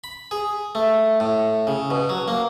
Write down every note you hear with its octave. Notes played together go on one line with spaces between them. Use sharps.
B5
G#4
A3
A2
C#3
B2
F#3
A#3